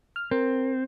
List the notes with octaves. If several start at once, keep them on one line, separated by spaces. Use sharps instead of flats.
F6
C4 A#4